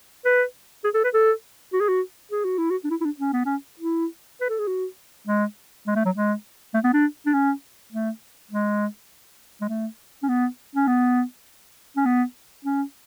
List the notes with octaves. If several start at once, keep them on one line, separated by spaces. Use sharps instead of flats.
B4
G#4
A4
B4
A4
F#4
G#4
F#4
G#4
F#4
E4
F#4
D4
E4
E4
D4
C#4
B3
C#4
E4
B4
A4
G#4
F#4
G#3
G#3
A3
F#3
G#3
A3
B3
D4
D4
C#4
A3
G#3
G#3
A3
C#4
B3
C#4
B3
C#4
B3
C#4